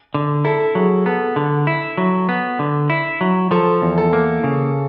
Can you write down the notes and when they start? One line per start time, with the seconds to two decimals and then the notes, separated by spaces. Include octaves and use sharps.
0.14 D3
0.45 E4 A4
0.75 F#3 G#4
1.06 B3 A4
1.36 D3 A4
1.67 E4
1.97 F#3
2.29 B3
2.59 D3
2.90 E4
3.21 F#3
3.51 F3 A4
3.82 E2
3.98 A4
4.13 A#3
4.44 C#3